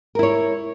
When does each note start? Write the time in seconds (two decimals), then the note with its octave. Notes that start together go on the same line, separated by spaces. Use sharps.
0.15 A#4
0.19 E4
0.23 C#5